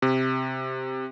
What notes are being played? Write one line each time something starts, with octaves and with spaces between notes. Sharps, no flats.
C3